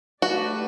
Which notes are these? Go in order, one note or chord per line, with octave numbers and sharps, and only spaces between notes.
A3 D4 F#4 G4 B4 D5